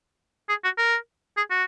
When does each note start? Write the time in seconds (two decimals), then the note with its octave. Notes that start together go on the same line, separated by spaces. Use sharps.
0.49 G#4
0.64 F#4
0.78 A#4
1.37 G#4
1.51 F#4